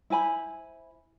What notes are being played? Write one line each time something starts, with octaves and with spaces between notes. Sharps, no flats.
E4 C5 G#5 B5